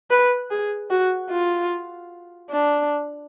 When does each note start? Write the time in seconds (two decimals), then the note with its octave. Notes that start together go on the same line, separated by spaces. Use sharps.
0.11 B4
0.50 G#4
0.90 F#4
1.30 F4
2.51 D4